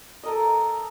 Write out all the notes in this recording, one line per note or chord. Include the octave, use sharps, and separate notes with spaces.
A4 A#4 D#5